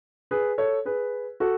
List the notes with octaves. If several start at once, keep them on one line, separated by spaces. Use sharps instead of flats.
G#4 B4
A4 C#5
G#4 B4
F#4 A4